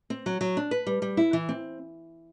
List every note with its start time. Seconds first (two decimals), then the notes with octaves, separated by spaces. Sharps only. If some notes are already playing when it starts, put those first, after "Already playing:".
0.10 C4
0.26 F#3
0.41 F#3
0.57 D4
0.71 B4
0.87 G3
1.02 G3
1.17 E4
1.33 E3
1.49 C4